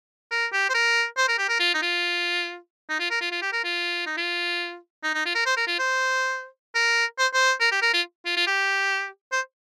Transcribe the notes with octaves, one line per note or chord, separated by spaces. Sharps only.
A#4
G4
C5
A#4
C5
A#4
G4
A#4
F4
D#4
F4
D#4
F4
A#4
F4
F4
G4
A#4
F4
D#4
F4
D#4
D#4
F4
A#4
C5
A#4
F4
C5
A#4
C5
C5
A#4
G4
A#4
F4
F4
F4
G4
C5